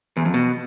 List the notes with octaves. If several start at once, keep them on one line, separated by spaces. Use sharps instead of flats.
E2
F2
B2